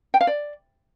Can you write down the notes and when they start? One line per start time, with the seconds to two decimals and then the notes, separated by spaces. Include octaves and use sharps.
0.14 G5
0.21 F5
0.27 D5